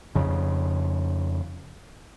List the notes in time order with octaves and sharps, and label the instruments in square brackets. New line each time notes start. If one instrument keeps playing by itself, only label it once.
[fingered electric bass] F2 C#3